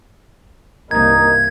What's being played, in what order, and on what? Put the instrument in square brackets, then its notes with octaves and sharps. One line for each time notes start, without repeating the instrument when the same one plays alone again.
[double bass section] C2 G2 A#3 [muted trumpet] D#4 [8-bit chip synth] G#6